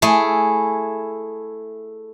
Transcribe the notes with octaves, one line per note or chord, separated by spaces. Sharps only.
A3 E4 G#4